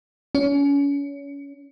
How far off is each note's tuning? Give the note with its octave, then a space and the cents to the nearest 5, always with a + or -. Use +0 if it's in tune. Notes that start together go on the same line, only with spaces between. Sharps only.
C#4 +30